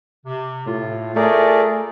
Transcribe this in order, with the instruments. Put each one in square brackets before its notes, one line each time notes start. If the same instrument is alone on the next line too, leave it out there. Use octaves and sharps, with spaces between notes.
[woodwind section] C3
[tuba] A2 [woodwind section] F4
[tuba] A3 [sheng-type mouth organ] G#4 A#4 D5